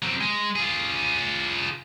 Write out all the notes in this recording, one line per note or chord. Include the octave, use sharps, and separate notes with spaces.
F#3 C4
G#3
F4 G#4